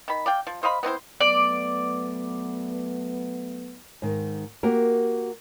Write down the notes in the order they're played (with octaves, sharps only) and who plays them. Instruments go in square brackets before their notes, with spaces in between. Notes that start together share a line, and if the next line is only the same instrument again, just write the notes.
[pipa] D#3 B5
D5 F5 G5
F3
C5 D#5 F5 B5
B3 C4 E4 C5
[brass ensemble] F#3 A3 B3 [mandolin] D5
[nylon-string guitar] G#2 D#3
A#3 F#4 G4 A#4